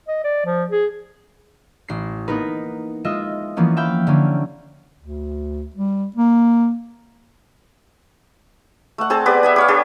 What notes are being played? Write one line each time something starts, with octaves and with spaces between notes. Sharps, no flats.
D#5
D5
F3
G#4
A1 C7
A#3 B3 D#4 A#4 B4
G#3 F4 D#5 E5
E3 F3 A#3 B3 C#4
E5 F5 G5 B5
D3 A#3 C#4 G4
D2
G3
A#3
A3 F#5
C4 G#4 C5 A5
B3 G4 G#4 D5
E5 F#5 D#6
G4 C#5 F5
D4 G4 A4